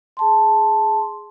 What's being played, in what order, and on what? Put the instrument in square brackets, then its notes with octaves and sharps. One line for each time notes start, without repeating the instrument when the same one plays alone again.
[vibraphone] G#4 A5 C6